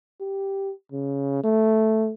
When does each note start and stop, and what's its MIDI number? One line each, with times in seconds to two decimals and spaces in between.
0.20 0.72 67
0.92 1.42 49
1.43 2.13 57